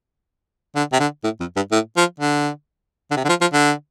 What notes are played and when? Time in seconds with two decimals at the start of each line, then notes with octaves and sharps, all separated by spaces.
0.75 D3
0.92 C3
0.99 D3
1.23 A2
1.40 F2
1.56 G2
1.71 A2
1.97 F3
2.20 D3
3.10 D3
3.16 C3
3.24 D3
3.29 F3
3.41 F3
3.53 D3